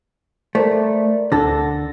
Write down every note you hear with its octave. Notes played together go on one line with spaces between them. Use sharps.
A3 A#4 C5 D5
D2 D3 A4 F#5 A#6